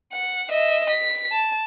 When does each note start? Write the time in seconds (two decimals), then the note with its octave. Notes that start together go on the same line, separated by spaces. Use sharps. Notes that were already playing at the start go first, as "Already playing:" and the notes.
0.13 F#5
0.51 D#5 E5
0.90 B6
1.32 A5